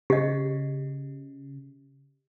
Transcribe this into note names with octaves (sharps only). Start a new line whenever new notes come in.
C#3 G4 D#5